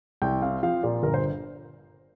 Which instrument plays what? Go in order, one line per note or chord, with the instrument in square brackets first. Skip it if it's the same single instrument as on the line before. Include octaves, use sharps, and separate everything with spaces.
[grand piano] C2 G5
C4 F5
F3 F5
A#2 D5
G1 A#4
C5